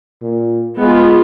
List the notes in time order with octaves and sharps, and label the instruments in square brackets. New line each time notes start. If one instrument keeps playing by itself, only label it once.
[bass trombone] A#2
[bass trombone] G#3 [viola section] B3 F4 G#4